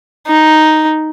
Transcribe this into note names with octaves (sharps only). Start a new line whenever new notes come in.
D#4